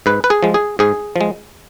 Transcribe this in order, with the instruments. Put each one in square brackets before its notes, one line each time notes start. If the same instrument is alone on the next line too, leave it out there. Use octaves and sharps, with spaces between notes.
[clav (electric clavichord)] G#2 B4
B4
G#4
F3 G#3
G#4
G#2 G#4
F3 G#3